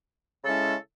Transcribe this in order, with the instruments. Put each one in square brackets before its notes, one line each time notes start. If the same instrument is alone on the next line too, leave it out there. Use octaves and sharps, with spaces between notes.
[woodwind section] C#3 G#3 C#4 E4 A4